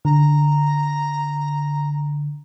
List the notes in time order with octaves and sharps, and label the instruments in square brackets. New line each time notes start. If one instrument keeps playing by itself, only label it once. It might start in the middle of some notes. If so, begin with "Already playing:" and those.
[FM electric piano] D3 [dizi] A#5